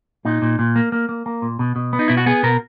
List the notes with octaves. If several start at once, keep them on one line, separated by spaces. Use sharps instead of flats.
A#2 D#4
A#2
A#2
A#3
A#3
A#3
A#3
A#2
B2
B2
B3
D#4
B2 E4
F#4
B3 G#4
B2 A#4